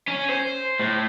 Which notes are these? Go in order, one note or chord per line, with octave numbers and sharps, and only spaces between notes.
C#4
C5
A2